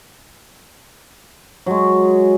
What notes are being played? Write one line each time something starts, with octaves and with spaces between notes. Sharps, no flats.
F#3 G#3